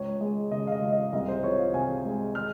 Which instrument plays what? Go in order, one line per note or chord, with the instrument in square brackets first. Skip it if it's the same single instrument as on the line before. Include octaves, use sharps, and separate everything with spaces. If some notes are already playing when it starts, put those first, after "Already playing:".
Already playing: [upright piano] C#2 C#5
G#3
C#3 D#5
F5
D#5
C#2
D#5
C2 D#5
C5
F3 C#5
F5
C3 G#5
G#3
F6